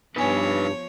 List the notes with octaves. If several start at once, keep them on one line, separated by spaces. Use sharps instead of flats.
G2 F3 B3 D#4 B4 C#5 G#5